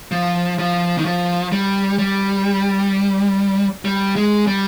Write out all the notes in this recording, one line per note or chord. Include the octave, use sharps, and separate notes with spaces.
F3
F3
D#3
F3
G3
G3
G3
G#3
G3